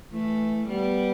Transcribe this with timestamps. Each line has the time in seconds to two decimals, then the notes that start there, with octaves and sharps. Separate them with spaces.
0.12 E3 A3
0.67 G3 B3